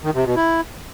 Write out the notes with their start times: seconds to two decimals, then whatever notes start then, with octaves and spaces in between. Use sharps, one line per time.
0.04 D#3
0.14 C3
0.25 B2
0.36 E4